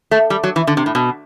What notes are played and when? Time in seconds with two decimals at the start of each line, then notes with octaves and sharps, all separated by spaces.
0.11 A3
0.30 G3
0.44 F#3
0.56 E3
0.67 D3
0.77 C3
0.86 A2
0.95 B2